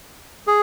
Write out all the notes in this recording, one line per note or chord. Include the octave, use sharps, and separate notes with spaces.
G#4